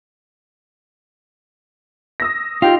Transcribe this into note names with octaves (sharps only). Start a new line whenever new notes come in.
D#6 E6 A#6
D#4 F4 G4 G5